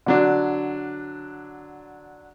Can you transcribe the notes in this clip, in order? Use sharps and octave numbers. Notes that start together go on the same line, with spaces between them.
D3 F#3 D4